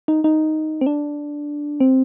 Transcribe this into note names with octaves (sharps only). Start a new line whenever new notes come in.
D#4
D#4
C4
D4
C4